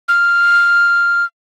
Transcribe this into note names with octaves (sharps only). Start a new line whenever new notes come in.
F6